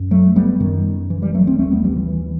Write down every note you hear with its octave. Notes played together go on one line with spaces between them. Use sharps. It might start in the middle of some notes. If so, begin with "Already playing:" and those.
Already playing: F#2
F#3 A3
G3 B3
F#2 D#3
E3
E3 G3
F#3 A3
A3 C4
D#2 A3 C4
G3 B3
E3 G3
E3
E3